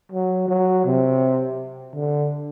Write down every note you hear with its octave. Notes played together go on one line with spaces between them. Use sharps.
F#3
F#3
C3
D3